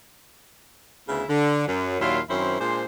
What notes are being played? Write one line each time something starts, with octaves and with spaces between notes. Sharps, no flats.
D2 C#3 B3 E4
D3
F#2
D#2 A#2 F#3 E4 F4 F5
F#2 D#3 C4 C#4 E4 C5
A#2 G#3 D4 C5